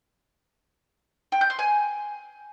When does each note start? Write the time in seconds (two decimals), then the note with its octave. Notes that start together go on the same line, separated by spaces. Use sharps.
1.32 G5
1.41 G6
1.50 C6
1.59 G#5